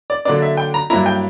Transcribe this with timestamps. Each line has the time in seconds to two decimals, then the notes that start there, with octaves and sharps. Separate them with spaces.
0.10 D5
0.25 D3 F#3 A#3 D4 D5
0.42 E5
0.57 G5
0.74 A#5
0.90 G2 F#3 A#3 E4 A#5
1.06 G5